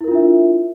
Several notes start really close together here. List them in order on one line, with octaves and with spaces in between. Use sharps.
E4 A#4 F4 D4 E5